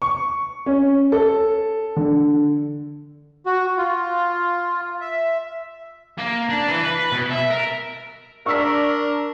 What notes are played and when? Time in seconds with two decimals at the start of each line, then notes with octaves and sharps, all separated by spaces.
0.02 C#6
0.66 C#4
1.12 A4
1.96 D3
3.46 F#4
3.78 F4
5.01 E5
6.18 A#3
6.49 D4
6.68 E3
6.83 B4
7.12 B2
7.30 E5
7.50 A#4
8.46 D4 A#4 C#6 E6 B6